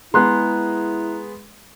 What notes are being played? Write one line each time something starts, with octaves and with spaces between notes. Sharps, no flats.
G#3 B3 E4 G#4 A#5 C6 F#6